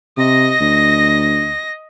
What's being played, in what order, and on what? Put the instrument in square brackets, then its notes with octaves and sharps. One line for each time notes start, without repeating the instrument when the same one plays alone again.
[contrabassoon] C3 [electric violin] D#5 A#6
[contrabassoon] D2